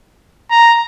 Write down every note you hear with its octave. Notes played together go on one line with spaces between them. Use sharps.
A#5